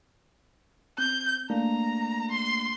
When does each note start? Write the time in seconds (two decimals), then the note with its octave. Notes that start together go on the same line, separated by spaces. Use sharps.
0.98 C4 G6
1.50 A3 A#3 D4 A#5
2.31 C6